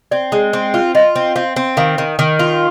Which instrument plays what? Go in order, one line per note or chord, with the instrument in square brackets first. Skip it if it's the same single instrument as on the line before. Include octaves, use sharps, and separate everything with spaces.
[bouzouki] C4 [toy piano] D5
[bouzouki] G#3
C4
F4
[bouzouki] F4 [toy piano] D#5
[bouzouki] C4
[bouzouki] C4 [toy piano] F5
[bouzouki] C4
[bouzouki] D#3 [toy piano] F5
[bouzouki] D#3
D#3
F4